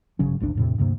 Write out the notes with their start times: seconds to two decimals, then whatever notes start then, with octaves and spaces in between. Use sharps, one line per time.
0.19 G1 C#3 F#3 C#4
0.40 G#1 D2 D3 D4
0.55 E2 A2 C3
0.78 D2 G2 C3 A#3